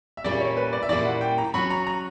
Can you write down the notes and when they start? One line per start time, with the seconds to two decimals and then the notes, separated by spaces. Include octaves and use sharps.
0.17 E5
0.24 A#2 G3 A#3 C#4 E4 D5
0.40 C#5
0.57 B4
0.73 D5
0.83 E5
0.89 A#2 G3 A#3 C#4 E4 D5
1.05 F#5
1.21 G5
1.38 A#5
1.54 F#3 C#4 F#4 C#5 B5
1.70 A#5
1.87 A#5